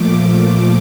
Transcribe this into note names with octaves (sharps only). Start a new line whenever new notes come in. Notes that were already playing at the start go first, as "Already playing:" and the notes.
Already playing: A#2 F3 A3 D6